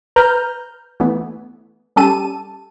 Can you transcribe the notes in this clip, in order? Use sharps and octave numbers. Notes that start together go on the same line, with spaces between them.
B4 A#5 F6 G6
E3 A3 B3
G3 C#4 G4 A4 A5 D#7